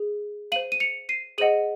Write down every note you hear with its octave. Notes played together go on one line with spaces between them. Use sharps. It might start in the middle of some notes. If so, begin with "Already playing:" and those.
Already playing: G#4
C5 F5 D#7 F#7
D#7
C#7 F7
C7 D#7
G#4 C5 D#5 F#5 D#7 F#7